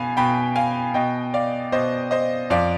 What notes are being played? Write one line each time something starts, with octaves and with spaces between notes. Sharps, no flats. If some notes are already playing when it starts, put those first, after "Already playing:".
Already playing: B2 F5 G#5 B5
B2 G5 B5
F5 G#5
B2 D#5 G5
D5 F5
B2 C5 D#5
C5 D#5
F2 D5 F5